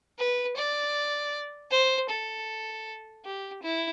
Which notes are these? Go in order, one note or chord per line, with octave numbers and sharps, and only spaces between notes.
B4
D5
C5
A4
G4
E4